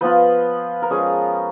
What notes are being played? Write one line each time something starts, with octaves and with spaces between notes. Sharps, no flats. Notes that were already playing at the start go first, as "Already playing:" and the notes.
F3 B3 F4 B4
A#4
F3 G#3 C#4 G#4